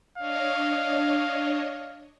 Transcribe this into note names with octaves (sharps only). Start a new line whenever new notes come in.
D4 C#5 D#5 F5